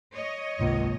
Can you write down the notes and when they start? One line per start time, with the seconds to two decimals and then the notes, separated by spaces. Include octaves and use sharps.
0.14 C#5 D#5
0.59 G#1 C#2 C3 A#3